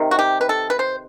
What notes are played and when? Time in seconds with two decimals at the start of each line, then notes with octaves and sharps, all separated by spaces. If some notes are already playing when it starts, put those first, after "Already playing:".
Already playing: C3 D#3
0.11 F#4
0.19 G4
0.41 B4
0.49 A4
0.70 B4
0.79 C5